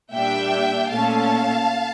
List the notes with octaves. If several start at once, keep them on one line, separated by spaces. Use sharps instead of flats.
A#2 G3 D4 E5 G5
A#2 A3 C#4 F5 A5